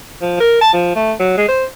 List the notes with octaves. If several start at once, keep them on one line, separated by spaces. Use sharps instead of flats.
F3
A#4
A5
F3
A3
F#3
G#3
C5